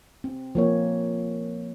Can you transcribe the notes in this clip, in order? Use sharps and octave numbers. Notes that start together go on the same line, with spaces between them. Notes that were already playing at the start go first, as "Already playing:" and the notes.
C4
F3 A#3 C#5